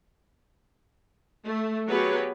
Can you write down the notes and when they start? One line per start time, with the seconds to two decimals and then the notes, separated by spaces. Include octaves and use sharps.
1.45 A3
1.88 F#3 B3 G4 G#4 B4 C#5